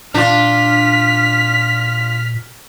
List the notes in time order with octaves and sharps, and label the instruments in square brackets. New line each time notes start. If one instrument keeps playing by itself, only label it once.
[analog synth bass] A#2 [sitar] D4 F4 [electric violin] F6 B6